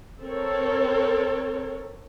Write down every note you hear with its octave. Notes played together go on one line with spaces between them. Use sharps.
C4 A4 A#4 C#5